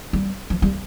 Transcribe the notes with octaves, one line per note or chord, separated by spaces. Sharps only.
G3
F3
G3